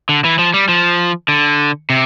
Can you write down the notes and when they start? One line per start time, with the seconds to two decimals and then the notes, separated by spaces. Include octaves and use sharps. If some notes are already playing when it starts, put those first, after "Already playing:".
0.09 D3
0.24 E3
0.39 F3
0.54 G3
0.69 F3
1.28 D3
1.90 C3